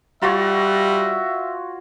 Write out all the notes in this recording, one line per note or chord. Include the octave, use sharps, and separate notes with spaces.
G3 F4 F#4 C#5 E5